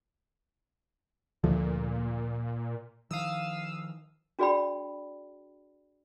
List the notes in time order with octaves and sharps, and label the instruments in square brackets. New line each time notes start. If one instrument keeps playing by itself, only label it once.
[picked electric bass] D2 F3 A3 [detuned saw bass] A#2
[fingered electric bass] D#3 F3 [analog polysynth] F5 D#6 E6
[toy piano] D4 F#4 G#4 D5 G5 B5